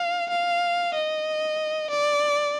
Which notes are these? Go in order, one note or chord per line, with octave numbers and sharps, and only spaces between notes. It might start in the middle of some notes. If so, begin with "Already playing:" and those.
Already playing: F5
F5
D#5
D5